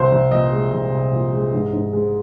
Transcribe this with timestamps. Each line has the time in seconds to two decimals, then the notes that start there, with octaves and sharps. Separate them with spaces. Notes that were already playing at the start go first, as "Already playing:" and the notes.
Already playing: C2 C5
0.12 C2
0.31 A#2 D#5
0.52 G#3
0.73 C2
0.93 C2
1.13 A#2
1.33 G#3
1.53 G#2
1.73 G#2
1.93 G#3